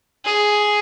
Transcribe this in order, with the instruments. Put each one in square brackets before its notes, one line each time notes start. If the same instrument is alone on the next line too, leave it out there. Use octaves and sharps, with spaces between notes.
[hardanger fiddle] G#4